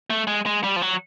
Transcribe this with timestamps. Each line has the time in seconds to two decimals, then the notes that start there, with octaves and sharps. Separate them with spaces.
0.10 A3
0.27 G#3
0.46 G#3
0.64 G3
0.76 F3
0.82 F#3